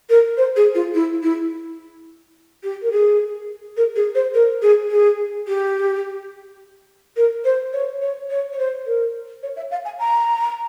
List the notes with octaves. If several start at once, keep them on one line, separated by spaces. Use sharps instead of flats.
A#4
C5
G#4
F4
E4
E4
G4
A#4
G#4
A#4
G#4
C5
A#4
G#4
G#4
G4
A#4
C5
C#5
C#5
C#5
C#5
C5
A#4
C#5
E5
F5
G#5
A#5